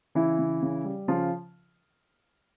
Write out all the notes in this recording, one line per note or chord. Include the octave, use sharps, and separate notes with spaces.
C#3 E3 E4
C#3
C#3
G3
C#3 F3 F4